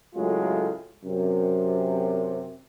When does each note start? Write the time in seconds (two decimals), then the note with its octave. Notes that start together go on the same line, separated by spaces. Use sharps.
0.15 C#2 A2 F#3 G#3 A3 F4
1.04 F#2 C3